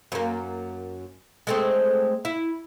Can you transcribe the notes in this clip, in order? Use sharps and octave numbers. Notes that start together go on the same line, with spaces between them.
F#2 A#3
G#3 A3 C4
E4